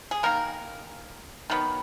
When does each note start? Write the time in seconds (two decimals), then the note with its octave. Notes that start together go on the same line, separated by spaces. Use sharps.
0.11 G#4
0.23 D#3 A#3 A#4
1.50 D#3 F#3 B3